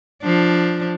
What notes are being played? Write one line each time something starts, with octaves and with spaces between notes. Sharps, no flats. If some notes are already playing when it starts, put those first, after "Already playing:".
F3 D4